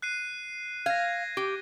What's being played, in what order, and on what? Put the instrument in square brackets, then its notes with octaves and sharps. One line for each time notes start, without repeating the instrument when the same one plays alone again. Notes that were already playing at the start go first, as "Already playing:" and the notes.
[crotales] F#6 C7 D#7
[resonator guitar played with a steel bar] F5 [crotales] G#6 A#6
[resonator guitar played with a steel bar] G4